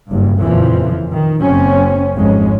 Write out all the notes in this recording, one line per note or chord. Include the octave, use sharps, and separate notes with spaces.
F#1 G2
F#1 F2 A#2 C#3 E3 F3
D#3
F#1 F#3 C4 C#4
G#1 F2 G#3 C#4